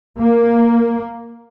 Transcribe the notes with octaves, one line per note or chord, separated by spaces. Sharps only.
A#3